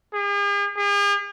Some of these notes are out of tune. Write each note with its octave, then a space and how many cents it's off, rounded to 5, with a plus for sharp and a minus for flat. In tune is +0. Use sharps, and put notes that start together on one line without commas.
G#4 -45
G#4 -45